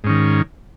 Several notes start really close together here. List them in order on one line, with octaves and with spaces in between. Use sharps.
G#2 C#4 D#3